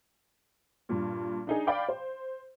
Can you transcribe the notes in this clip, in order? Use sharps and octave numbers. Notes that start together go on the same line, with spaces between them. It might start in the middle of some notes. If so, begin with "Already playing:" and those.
G2 A#2
D4 D#4 G#4
D5 F5 G5 B5 D6
C5